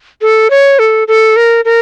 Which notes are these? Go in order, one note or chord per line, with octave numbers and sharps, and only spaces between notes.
A4
C#5
A4
A4
A#4
A#4